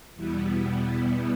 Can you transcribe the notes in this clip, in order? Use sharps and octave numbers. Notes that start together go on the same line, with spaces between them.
E2 B2 G3 B3 E4